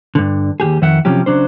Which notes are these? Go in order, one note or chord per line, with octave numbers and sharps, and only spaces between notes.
G2 D3
D#2 A#2 G4 G#4
F2 D#3 E5 F#5
C3 F3 F#3 C#4 G4
C#3 F#3 D4 C5